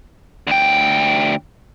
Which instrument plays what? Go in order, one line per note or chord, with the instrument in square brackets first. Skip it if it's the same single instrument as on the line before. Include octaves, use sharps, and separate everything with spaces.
[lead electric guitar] D2 G5